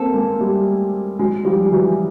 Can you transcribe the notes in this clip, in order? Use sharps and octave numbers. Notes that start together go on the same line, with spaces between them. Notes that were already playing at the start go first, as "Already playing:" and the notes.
Already playing: A#3 C4 A4
G#3 A#3
G3 A3
F#3 G#3
F3 G3
E3 F#3